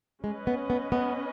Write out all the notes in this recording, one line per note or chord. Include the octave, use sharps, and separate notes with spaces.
G#3 C#4 B4 D#5
B3
B3
B3